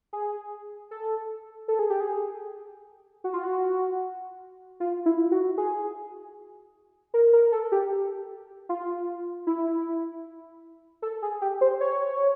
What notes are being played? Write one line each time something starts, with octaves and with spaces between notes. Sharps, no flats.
G#4
A4
A4
G#4
G4
G#4
F#4
F4
F#4
F4
E4
F#4
G#4
A#4
A#4
A4
G4
F4
E4
A4
G#4
G4
C5
C#5